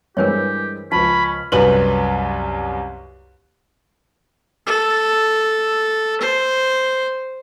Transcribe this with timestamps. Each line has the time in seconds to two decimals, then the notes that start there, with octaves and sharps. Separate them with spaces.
0.17 G2 E3 G#3 G4 A#4 C5 C#5
0.92 C#2 F3 C#4 A5 B5
1.52 C2 F#2 B4 F#7
4.66 A4
6.21 C5